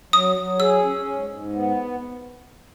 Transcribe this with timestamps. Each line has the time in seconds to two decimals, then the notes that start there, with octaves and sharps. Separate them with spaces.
0.13 F#3 D#6
0.37 F#3
0.60 G#4 E6
0.83 C#4
1.07 G#2
1.30 G#2
1.53 B3